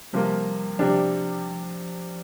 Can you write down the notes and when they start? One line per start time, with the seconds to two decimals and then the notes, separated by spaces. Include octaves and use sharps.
0.13 C3 F3 G3 A#3
0.79 C3 F3 G3 D4